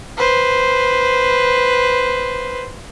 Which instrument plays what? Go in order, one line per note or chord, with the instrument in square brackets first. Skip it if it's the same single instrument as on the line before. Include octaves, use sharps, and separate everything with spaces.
[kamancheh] B4 C5